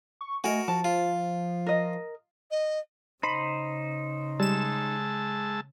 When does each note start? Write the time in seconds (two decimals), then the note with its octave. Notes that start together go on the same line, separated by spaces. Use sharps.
0.21 C#6
0.44 A3 F#4 A#4 D#5 G#5
0.68 F3 A5
0.84 F4
1.66 A#4 D#5
2.50 D#5
3.23 C#3 D#4 C5 B5
4.40 G3 G#3 A5 E6 E7